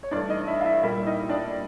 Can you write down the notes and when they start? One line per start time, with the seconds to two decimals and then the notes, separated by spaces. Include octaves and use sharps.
0.03 C#5
0.11 G2 E3 A3 D4 D5
0.29 D#4 D#5
0.47 E4 E5
0.61 F5
0.65 E4 E5
0.83 A#2 G3 A#3 E4 E5
1.06 D#4 D#5
1.29 D4 D5